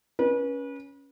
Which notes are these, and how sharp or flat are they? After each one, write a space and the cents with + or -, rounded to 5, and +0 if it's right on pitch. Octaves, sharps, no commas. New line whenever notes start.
C#4 +10 B4 -35